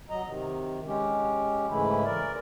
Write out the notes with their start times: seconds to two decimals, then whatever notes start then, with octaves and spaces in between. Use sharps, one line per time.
0.10 F#3 D#5 A#5
0.26 C3 D#3
0.87 G#3 C#4 G4
1.69 G#2 C#3 E3 G#3 A3 E4
2.05 A#4 D5